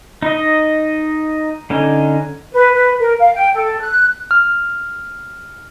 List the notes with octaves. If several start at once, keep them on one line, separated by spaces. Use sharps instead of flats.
D#4 D#5
D3 C#4 D#4
B4
B4
A#4
F5
G5
A4
F#6
F6